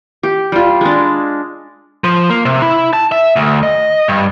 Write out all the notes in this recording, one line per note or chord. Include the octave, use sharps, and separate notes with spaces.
G4
G3 F4
G#3 D4
F3
A#3
C3
E4
A5
E5
D2
D#5
G2